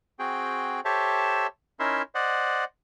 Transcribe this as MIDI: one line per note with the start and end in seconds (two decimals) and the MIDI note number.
0.19 0.80 60
0.19 0.80 66
0.19 0.80 68
0.19 0.80 79
0.85 1.47 67
0.85 1.47 69
0.85 1.47 72
0.85 1.47 73
0.85 1.47 76
0.85 1.47 81
1.80 2.02 61
1.80 2.02 63
1.80 2.02 64
1.80 2.02 70
1.80 2.02 76
1.80 2.02 84
2.15 2.64 72
2.15 2.64 74
2.15 2.64 75
2.15 2.64 78